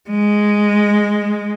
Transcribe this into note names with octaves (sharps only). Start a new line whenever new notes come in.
G#3